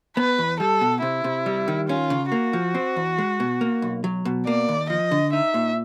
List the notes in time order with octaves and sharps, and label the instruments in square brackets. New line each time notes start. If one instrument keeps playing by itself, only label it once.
[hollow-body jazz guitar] B3 [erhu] B4
[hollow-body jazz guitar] E2
[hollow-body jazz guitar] G3 [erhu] A4
[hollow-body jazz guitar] B2
[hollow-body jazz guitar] C3 [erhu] E4
[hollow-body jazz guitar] C3
G3
D#3
[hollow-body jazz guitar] C#4 [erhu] F4
[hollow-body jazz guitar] C#3
[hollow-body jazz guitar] A#3 [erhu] F#4
[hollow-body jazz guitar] F3
C4
E2
G#3
B2
A#3
B1
F#3
B2
[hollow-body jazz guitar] A#3 [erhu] D5
[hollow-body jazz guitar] D#2
[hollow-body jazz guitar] F3 [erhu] D#5
[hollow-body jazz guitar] D3
[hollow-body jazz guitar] D#4 [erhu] E5
[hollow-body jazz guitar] A#2